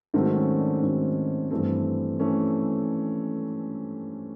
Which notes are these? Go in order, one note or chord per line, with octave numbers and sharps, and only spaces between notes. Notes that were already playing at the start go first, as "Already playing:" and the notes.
G#2 D#3 F#3 A3 C4
C4
C#4
D4
G#2 D#3 F#3 A3 C4
G2 E3 A3 C4
E3 A3 C#4